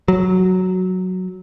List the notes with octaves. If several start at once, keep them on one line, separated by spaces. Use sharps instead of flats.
F#3